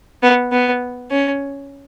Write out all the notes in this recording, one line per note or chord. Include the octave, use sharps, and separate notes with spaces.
B3
B3
C#4